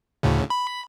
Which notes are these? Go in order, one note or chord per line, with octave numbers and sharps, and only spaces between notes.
D2 A2 C#3
B5